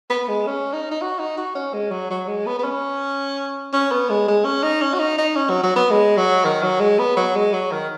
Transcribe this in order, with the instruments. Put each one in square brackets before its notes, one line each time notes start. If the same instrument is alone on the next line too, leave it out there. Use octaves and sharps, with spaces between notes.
[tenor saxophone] B3
G#3
C#4
D#4
D#4
F#4
D#4
F#4
C#4
G#3
F#3
F#3
G#3
B3
B3
C#4
C#4
B3
G#3
G#3
C#4
D#4
C#4
F#4
D#4
D#4
C#4
F#3
F#3
B3
G#3
F#3
D#3
F#3
G#3
B3
F#3
G#3
F#3
D#3